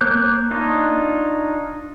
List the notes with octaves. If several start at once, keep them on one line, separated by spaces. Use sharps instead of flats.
A#3 C#5 D6 F#6 G6
D4 D#4 F4 C#5